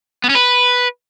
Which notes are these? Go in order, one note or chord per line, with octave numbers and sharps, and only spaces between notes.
B3
C#4
B4